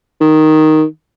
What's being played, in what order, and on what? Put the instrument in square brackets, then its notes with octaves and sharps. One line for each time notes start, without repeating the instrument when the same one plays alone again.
[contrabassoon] D#3